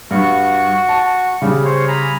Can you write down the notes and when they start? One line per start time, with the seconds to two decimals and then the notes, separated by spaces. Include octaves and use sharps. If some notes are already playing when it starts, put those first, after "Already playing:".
0.11 G2 F#4 C#6
0.89 A5
1.42 C#3 G3
1.65 C5 C#5
1.88 G#5 A#5 B5